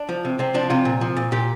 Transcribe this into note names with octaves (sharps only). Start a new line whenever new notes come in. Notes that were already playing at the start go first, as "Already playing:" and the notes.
Already playing: D4
F3
C3
C3 C4
F3 D4
C3 F4
A#2
F3
A#2
A#2 G4